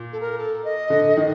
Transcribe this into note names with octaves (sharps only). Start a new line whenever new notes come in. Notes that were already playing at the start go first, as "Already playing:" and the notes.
Already playing: A#2
A4
A#4
A4
D#5
D3
D#3